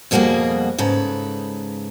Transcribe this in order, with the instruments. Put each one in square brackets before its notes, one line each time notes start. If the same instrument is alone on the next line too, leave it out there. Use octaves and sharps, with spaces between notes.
[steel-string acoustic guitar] F2 B2 G3 A#3 F#4 G#4
G#2 C#3 A4 B4